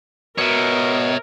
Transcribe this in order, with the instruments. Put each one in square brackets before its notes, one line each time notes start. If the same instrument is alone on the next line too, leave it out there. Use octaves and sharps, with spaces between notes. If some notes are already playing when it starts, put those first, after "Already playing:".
[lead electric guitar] B2 [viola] A#4 [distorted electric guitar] C#5 E5